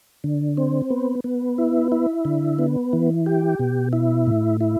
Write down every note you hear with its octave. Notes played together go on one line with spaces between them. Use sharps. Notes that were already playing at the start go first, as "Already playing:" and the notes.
D3
C4
B3
B3
E4
E4
D3
B3
E3
G4
B2
E4
A2
E4